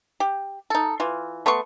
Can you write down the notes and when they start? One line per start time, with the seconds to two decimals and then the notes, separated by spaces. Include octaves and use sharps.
0.20 G4
0.70 D#4 A4
1.00 E3 F4
1.46 A3 B3 C6 C#6